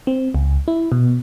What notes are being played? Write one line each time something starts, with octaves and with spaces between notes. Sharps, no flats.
C4
C#2
E4
B2